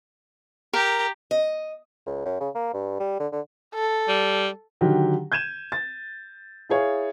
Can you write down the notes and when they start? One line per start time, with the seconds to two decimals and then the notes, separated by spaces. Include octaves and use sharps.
0.73 G4 A#4 A#5
1.31 D#5
2.06 C#2
2.25 F#2
2.40 C#3
2.55 A#3
2.74 G2
3.00 G3
3.19 D3
3.32 D3
3.74 A4
4.08 G3
4.81 D3 D#3 F#3 G4
5.32 G6 G#6 D#7 E7
5.72 A6
6.69 E4 G#4 C#5 F5